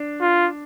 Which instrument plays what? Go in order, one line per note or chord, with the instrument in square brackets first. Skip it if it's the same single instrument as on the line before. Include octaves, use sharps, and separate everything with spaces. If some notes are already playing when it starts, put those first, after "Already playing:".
Already playing: [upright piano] D4
[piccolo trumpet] F4